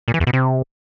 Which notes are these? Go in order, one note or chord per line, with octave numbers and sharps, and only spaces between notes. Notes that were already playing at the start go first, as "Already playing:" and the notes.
A#2
E3
E2
B2
C3